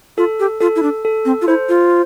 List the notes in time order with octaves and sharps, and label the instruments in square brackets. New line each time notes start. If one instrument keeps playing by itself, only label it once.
[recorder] F4 [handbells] A4
[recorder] G4
[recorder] F4 [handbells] A4
[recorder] E4
D4
[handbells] A4
[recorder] C4
F4
[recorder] E4 [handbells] C5
[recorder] F4